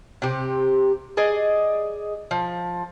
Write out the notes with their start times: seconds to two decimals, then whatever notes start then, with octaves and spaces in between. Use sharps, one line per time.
0.22 C3 G4
1.17 G#4 D5 D#5
2.31 F3